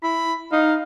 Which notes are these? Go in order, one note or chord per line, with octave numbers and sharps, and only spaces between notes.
E4 B5
D#4 F5